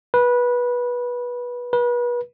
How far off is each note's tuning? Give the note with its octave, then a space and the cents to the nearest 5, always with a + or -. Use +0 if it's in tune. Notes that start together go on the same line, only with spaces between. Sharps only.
B4 -20
B4 -35